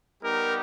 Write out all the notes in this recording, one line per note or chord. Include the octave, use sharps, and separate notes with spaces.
G3 B3 D#4 G4 A#4